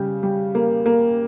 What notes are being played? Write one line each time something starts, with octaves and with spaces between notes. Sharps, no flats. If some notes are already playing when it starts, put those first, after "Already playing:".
Already playing: C#3 G3
G3
A#3
A#3